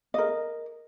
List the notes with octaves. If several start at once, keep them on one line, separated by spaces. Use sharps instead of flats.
A#4 D#5